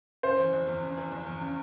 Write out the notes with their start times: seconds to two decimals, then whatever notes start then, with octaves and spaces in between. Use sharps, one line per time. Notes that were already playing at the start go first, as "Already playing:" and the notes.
0.23 C#3 C5
0.38 E3
0.53 F1
0.67 E2
0.82 C#3
0.97 E3
1.12 F1
1.26 E2
1.41 C#3